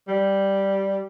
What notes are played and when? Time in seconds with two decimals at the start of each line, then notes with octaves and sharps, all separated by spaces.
0.08 G3